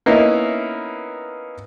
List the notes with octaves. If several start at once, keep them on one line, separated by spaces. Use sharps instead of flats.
A#3 B3 C#4 D#4 E4